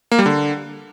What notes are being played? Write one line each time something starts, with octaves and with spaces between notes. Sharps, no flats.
A#3
G3
D3